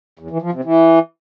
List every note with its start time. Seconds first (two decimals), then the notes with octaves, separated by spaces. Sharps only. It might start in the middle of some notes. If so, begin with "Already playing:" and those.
0.19 E2
0.31 E3
0.42 F3
0.53 C3
0.64 E3